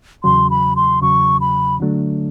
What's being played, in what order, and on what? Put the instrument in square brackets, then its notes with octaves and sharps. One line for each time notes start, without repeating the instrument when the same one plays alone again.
[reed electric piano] E2 C#3 F#3 [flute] C6
[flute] B5
C6
[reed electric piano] E2 C#3 F#3 [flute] C#6
[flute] B5
[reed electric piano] D3 F#3 A3 D4